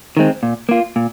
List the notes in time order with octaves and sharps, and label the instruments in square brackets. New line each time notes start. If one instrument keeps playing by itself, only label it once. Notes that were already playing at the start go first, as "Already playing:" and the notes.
[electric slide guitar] D#3 G#3 C4
A#2
A#3 F4
A#2